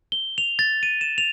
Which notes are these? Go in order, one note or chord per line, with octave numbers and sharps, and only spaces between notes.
G7
F7
A6
D#7
E7
F7